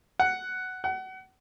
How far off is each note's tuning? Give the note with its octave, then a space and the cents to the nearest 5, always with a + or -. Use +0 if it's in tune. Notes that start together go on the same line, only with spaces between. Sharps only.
F#5 +5
F#5 +30